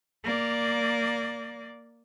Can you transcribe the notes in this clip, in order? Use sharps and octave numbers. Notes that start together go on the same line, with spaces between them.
A#3 D5